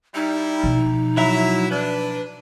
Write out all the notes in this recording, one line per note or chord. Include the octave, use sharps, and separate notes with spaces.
G3 D#4 E4
B2 F3
F#3 E4 E5 A#5
D4 B4